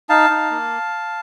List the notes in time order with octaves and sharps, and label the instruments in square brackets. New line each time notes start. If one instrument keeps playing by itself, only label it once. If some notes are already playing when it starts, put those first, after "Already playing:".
[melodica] D#4 F5 A5
D#4
A#3